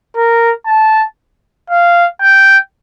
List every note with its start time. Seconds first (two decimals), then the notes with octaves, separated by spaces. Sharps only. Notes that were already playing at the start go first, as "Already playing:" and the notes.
0.16 A#4
0.67 A5
1.70 F5
2.22 G5